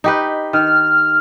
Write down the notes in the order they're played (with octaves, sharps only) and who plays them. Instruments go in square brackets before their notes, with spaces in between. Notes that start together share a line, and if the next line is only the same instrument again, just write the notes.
[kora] D#4 G4 B4
[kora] D#3 [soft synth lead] F6